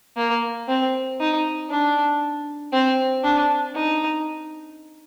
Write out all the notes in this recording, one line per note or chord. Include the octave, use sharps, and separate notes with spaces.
A#3
C4
D#4
D4
C4
D4
D#4